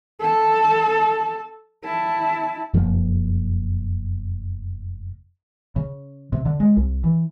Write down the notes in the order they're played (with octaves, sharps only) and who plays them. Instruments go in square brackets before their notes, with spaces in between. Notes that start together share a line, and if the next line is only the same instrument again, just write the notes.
[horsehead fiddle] A4 A5
E4 A5
[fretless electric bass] F1 F#2 F3 A#3
[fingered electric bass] C#3
C3
D3
G#3
C2
E3